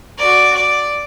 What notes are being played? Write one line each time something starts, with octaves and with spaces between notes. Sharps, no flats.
F#4 D5
D5